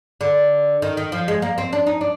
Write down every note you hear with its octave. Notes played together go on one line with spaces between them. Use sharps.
D3
D#3
D#3
F3
G#3
A#3
C4
D4
D#4
D4